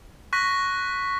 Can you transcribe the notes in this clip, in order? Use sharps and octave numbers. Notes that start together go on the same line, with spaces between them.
C#6 F#6 A#6 B6